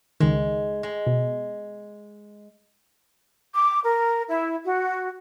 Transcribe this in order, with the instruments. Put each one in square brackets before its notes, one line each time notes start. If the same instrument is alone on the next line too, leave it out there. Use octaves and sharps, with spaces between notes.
[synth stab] C#2 D#3 [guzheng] G#3
[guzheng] G#3
[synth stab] B2
[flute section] D6
A#4
E4
F#4